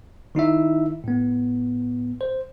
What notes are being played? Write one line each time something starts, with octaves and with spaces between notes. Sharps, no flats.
D#3 D#4 E4 E5
A2 B3
C5